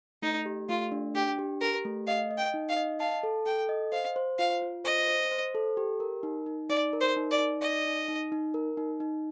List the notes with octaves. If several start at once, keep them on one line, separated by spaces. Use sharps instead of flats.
A3 D#4
G4
A3 F4
D4
D4 G4
G4
G4 A#4
A3
D#5 F5
D#5
G5
D#4
F5
D#5
F5 A5
A4
A4 G5
D#5
C5 F5
C5
F4 F5
F4
C5 D#5
C5
C5
A4
G4
A#4
D#4
D#4
D#4 D5
A#4
C5
D#4
D5
D#4
D5 D#5
D#4
D#4
D#4
A#4
D#4
D#4